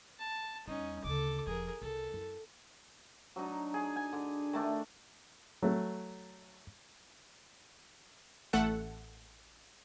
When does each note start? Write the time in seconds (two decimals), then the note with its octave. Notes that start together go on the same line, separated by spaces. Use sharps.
0.19 A5
0.68 E2 G3 C#4 D#4
1.04 D2 C#3 A4 D6
1.47 E1 F3 G#4 A#4
1.82 C2 A4
2.13 F#2 E4
3.36 F#3 D4 D#4
3.74 G#4
3.96 G#5
4.13 D3
4.53 D#3 A3 D4
5.63 F#3 A3
8.53 A1 A3 A4 F#5